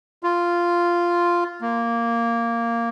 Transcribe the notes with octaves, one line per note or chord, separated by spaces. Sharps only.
F4
A#3